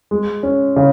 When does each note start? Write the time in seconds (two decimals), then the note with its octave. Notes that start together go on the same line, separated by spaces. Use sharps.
0.11 G#3
0.43 C#4
0.76 C#3